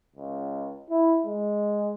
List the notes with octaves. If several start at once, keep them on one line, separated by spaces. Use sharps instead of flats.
C#2
E4
G#3